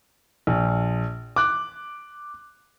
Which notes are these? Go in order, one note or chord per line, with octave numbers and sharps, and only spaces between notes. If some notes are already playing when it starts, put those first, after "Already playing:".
A#1
D6 F#6